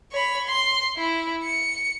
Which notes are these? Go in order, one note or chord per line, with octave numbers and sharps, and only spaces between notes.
C#5 B5
C6
E4
C#7